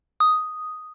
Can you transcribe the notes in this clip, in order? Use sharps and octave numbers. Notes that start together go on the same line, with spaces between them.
D#6